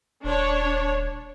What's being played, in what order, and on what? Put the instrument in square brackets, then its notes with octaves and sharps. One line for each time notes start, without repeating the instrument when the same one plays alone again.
[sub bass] D#1 [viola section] D4 C#5